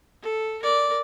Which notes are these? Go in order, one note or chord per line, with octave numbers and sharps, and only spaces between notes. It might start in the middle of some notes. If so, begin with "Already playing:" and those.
A4
A#4 D5